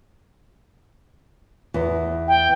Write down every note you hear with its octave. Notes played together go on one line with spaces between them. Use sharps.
E2
G5